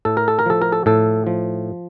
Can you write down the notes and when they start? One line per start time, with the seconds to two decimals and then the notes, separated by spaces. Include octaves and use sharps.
0.05 A2 A4
0.17 A#4
0.28 A4
0.39 A#4
0.46 F3 A4
0.62 A#4
0.72 A4
0.86 A2 A4
1.27 F3